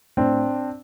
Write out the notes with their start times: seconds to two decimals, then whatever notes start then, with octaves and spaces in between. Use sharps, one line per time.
0.17 A2 C4 D4